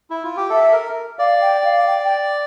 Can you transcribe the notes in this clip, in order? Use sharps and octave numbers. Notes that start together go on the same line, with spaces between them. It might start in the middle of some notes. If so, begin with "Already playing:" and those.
E4
F4
G4
A4 E5
A4
A#4
D5 F5
G5
F5
G5
G5